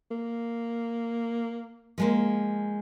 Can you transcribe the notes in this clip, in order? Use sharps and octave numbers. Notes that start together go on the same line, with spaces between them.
A#3
F3 G#3 A#3